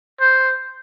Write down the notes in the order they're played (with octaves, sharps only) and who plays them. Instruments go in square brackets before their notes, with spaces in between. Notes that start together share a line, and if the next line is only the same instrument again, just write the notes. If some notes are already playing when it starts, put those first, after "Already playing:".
[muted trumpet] C5